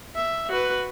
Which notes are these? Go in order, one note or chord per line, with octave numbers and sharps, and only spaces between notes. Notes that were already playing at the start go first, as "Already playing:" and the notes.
E5
F#4 B4